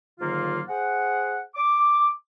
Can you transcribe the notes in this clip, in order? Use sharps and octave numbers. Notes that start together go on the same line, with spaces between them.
G#2 D3 D#3 F#3 A#3 F4
G#4 C5 F#5
D6